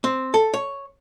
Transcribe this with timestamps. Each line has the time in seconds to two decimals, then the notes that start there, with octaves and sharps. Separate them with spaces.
0.04 C4
0.34 A4
0.54 C#5